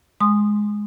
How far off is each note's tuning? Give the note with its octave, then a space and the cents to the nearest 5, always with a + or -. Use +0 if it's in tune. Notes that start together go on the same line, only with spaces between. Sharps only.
G#3 +0 C6 +0 D#6 -15